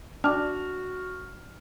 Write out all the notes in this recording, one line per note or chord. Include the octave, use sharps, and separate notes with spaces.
D4 F#4 A5 D6 F6